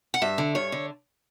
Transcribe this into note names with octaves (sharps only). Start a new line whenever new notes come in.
F#5
G2 E5
D3
G2 C#5
D3